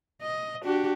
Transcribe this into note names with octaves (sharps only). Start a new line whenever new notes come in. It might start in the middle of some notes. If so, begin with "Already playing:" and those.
D#5
D4 F#4 G4